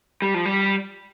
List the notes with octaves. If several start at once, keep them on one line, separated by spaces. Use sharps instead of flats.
G3
F3
G3